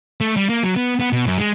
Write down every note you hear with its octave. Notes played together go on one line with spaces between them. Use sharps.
A3
G3
A#3
F#3
B3
B3
B2
F#2
G#3